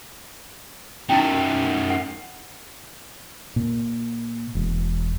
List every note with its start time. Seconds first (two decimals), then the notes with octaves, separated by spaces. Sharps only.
1.09 F#2 D#3 D#4 E4 G5
1.90 F#5
3.56 A#2
4.55 E1